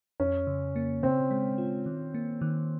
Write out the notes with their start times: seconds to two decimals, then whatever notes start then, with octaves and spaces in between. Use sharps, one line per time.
0.20 F2 C#4
0.47 C#3
0.76 A#3
1.03 C#3 C4
1.31 G#3
1.58 F4
1.86 D#3
2.14 A#3
2.41 D#3